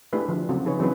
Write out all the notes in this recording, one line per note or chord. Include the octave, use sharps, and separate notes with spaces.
A3 D4 E4 G4 G#4 B4
D3 F3
C#3 F#3 C4 F#4
F3 D#4 G#4 B4 C#5
E3 F#3 C4 C#4 G#4 B4